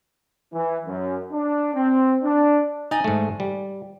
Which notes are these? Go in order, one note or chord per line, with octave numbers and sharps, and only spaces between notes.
E3
F#2
D4
C4
D4
D#4 D5 D#5 G#5
G#2 A3
G3